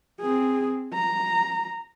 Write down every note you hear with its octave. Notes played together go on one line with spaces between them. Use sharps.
C4 G#4
A#5